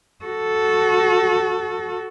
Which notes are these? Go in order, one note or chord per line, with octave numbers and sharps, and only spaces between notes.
F#4 A4